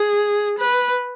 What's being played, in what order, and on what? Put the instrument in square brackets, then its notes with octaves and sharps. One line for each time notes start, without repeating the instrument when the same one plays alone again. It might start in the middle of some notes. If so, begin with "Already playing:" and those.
Already playing: [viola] G#4
B4